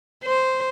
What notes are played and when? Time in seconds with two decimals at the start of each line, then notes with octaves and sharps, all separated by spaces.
0.24 C5